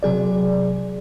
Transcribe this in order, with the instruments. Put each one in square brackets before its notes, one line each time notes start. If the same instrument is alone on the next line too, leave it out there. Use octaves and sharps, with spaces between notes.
[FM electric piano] C3 F#3 G#4 D5